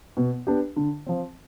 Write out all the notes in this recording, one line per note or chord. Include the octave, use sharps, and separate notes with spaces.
B2
B3 D4 G4
D3
F3 C4